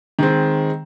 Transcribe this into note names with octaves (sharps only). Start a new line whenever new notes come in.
D#3 G#3 C4